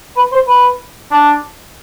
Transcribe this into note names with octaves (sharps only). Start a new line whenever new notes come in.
B4
C5
B4
D4